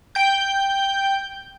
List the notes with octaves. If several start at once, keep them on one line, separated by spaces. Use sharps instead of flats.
G5 G6